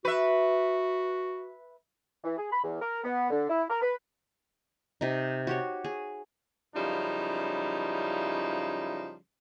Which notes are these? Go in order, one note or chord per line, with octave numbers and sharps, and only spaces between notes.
F#4 B4 E5
E3
G#4
B5
E2
A#4
B3
D3
E4
A#4
B4
C3 D#4
F#4 G4 C#5
G#4
F#2 C#3 F3 G3 D#4 E4